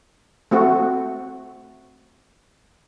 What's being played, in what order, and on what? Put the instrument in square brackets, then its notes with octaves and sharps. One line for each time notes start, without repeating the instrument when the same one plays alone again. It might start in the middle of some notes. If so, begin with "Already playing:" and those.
[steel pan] A3 C4 F#4